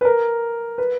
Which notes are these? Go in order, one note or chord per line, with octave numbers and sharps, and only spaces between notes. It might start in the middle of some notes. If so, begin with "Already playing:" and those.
B4
A#4
B4